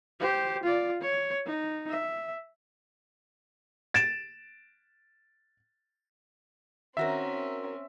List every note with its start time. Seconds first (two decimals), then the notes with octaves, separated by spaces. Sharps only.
0.20 G4 C5
0.63 F4 D5
1.01 C#5
1.46 D#4
1.90 E5
3.94 A6 D7 E7
6.97 D#3 C4 C#4 F#4 A#4 E5